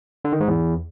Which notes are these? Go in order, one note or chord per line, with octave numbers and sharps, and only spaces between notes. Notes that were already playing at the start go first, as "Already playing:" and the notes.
D3
D#3
G#2
E2